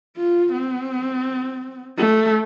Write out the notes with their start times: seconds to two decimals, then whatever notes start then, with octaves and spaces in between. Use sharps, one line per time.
0.17 F4
0.53 C4
1.97 A3